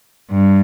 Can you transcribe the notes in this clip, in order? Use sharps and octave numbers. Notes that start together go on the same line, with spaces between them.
G2